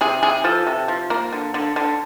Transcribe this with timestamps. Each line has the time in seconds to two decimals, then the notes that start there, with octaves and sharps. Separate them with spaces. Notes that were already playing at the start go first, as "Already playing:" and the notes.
0.01 C3 G#4
0.23 C3 G#4
0.44 F3 A4
0.67 C3
0.88 F3
1.10 A#3
1.33 D3
1.54 D3
1.76 D3